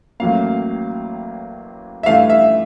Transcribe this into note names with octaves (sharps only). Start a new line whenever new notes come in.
A1 A2 F#3 A#3 F5
E5
G2 E3 A3 F5
E5